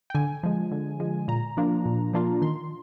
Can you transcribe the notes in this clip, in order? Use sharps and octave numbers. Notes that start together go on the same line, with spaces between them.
G5
D3 G#5
F3 G#3
D3
F3 G#3
A#2 A#5
F3 A#3 D4 F4
A#2
F3 A#3 D4 F4
D#3 C6